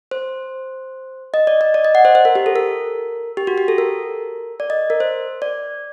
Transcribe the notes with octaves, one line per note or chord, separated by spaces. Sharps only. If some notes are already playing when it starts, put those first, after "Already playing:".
C5
D#5
D5
D#5
D5
D#5
F#5
C5
C5
A#4
G4
A4
A#4
G4
F#4
G4
A4
A#4
D5
D#5
A#4
C5
D5